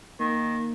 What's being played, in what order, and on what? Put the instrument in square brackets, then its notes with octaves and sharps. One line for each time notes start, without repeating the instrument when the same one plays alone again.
[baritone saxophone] D#3 [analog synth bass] A#3